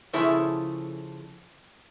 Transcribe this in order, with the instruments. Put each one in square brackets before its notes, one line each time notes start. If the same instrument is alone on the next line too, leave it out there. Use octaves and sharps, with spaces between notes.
[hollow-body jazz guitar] C#3 F3 E4 G#4 A4 C#5